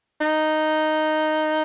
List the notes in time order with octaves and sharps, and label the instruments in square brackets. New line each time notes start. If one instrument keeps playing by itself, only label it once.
[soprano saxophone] D#4